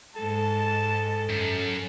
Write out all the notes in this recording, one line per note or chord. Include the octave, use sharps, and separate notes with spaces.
G#2 G#3 A4 A5
F#2